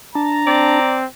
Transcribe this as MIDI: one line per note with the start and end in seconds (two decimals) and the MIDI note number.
0.15 0.79 62
0.15 0.79 81
0.15 0.99 82
0.47 1.06 60
0.47 0.98 74